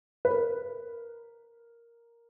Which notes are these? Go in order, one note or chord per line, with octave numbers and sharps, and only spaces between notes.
B4
A#4